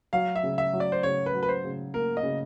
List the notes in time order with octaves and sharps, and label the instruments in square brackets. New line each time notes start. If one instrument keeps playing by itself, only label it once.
[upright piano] F#3 [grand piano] F5
[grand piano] E5
[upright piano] C#3
[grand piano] E5
[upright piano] F#3
[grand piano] D5
C5
[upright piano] C#3 [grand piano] C#5
[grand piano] B4
[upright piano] F#3
[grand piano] B4
C5
[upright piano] C#3
[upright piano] A#3 [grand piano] A#4
[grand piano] D#5
[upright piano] C#3